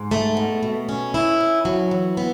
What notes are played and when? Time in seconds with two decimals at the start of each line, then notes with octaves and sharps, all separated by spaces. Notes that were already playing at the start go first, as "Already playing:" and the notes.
Already playing: G#2
0.11 A3
0.37 B2
0.63 B2
0.89 C#4
1.14 E4
1.41 C#4
1.65 F#3
1.91 E3
2.17 B3